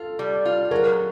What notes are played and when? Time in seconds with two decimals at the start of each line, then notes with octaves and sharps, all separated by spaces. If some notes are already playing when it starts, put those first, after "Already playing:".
Already playing: F4 A4
0.19 G3
0.45 F4
0.71 F#3 G#4 A#4